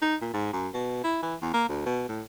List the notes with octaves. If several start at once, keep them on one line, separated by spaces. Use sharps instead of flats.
D#4
A#2
G#2
F#2
B2
E4
E3
E2
A#3
D2
B2
A2